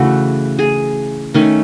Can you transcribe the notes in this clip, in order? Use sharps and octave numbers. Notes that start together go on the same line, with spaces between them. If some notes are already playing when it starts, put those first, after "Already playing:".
Already playing: C#3 E3 A3 F#4
G#4
D#3 A3 C#4